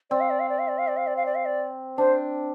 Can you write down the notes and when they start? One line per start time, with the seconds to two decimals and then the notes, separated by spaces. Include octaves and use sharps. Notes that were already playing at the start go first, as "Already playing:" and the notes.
0.11 C4 D5
0.21 F5
0.30 D5
0.40 F5
0.49 D5
0.59 F5
0.68 D5
0.78 F5
0.88 D5
0.97 F5
1.07 D5
1.17 F5
1.26 D5
1.35 F5
1.45 D5
1.98 D4 C5